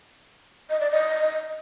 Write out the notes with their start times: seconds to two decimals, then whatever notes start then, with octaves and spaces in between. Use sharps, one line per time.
0.70 D#5
0.81 D5
0.91 D#5